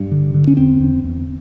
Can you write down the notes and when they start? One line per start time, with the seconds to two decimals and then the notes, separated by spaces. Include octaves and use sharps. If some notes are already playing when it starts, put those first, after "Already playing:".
Already playing: G2
0.12 D3
0.34 D3
0.47 C#4
0.57 E2 C4
0.80 E2
1.04 E2